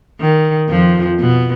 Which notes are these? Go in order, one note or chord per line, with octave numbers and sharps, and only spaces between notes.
D#3
F2 F3
B2 B3